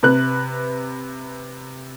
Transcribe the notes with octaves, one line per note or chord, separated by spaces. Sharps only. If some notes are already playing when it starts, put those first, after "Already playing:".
C3 B4 F#6